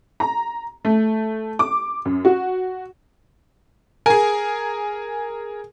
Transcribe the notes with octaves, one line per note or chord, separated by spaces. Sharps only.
A#5
A3
D6
F#2
F#4
G#4 A#4 G#5